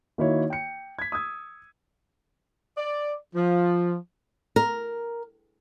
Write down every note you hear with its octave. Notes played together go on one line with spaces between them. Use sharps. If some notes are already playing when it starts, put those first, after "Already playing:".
D#3 A#3 D#4 E4 F#4 C#5
G5 C#7
G#6 B6
D#6 E6 G#6
D5
F3
A#4